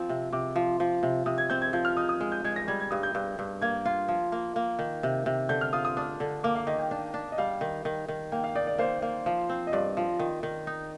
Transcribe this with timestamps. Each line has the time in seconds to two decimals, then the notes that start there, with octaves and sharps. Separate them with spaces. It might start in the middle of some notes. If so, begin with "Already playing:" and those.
Already playing: F3 C4
0.09 C3
0.33 C3 D6
0.56 F3
0.80 F3
1.03 C3
1.26 C3 D#6
1.38 G#6
1.50 C4 G6
1.62 G#6
1.73 F3 G6
1.85 F6
1.97 D#4 D#6
2.09 D#6
2.21 G#3
2.32 G6
2.45 G#3 G#6
2.56 A#6
2.68 G3 G#6
2.80 G#6
2.91 G2 D#6
3.03 G6
3.15 G2
3.39 G2
3.62 A#3 G#6
3.85 F4
4.08 F3
4.32 A#3
4.56 A#3
4.79 D#3
5.03 C3
5.26 C3
5.49 D3 G6
5.61 F6
5.73 F4 D#6
5.85 D#6
5.97 D4 D#6
6.20 D3
6.44 A#3 D6
6.56 F5
6.67 D#3 D#5
6.79 G5
6.91 D4
7.14 D4
7.32 D#5
7.38 G3 F5
7.61 D#3
7.85 D#3
8.08 D#3
8.32 A#3 G5
8.44 F5
8.55 D#4 D5
8.67 D5
8.78 A#3 C5
9.02 A#3
9.26 F3
9.49 C4
9.67 D#5
9.72 G2 D5
9.97 F3
10.19 D#3
10.43 D#3
10.67 D#4